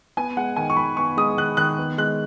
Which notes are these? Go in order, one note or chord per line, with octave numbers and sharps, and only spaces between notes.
B3 G#5
G#3 F#5
D#3 G#5
C#6
D#3 B5
B3 C#6
G#3 D#6
D#3 F#6
D#3 F#6
B3
G#3 F#6